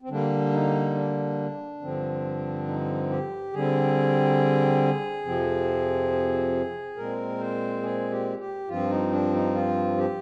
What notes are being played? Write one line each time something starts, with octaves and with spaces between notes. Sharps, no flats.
C4
D3 G3 A#3 D4
D#4
D4
G2 D3 F3 C4
D#4
G4
D3 G3 C4 G#4
F2 C3 F3 C4
A#2 G#3 C4 A#4
C5
G#4
G4
G4
G2 F3 C4 F4
D#4
D4
D#4
F4
G4